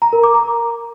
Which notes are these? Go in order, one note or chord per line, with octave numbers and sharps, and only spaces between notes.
A#5
A#4
D6
A#5